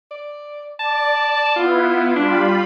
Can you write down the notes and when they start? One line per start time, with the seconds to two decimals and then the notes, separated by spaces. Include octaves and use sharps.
0.11 D5
0.79 D5 A5
1.56 B3 E4 F4
2.16 G3 D4 F4 B5